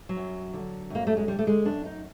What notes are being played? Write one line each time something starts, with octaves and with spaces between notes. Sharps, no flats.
F#3
F#2
D3
F#2 A#3
A3
G#3
D3 G3
A3
G#3
F#2 D4
D#4